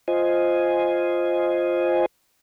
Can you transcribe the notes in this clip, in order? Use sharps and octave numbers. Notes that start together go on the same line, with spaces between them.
F4 C5 D#5 G#5